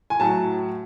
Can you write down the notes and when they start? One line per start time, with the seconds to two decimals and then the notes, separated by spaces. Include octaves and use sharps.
0.10 G#5
0.20 A2 F#3 A5